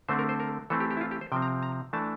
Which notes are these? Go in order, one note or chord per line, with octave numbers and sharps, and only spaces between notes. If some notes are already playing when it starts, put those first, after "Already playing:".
D3 A3 C4 C5
A#4
C5
A#4
E3 A3 C4 A4
G4
G4
E4
F4
G4
C5
C3 F3 C4 G5
A#5
A#5
E3 A3 D4 A5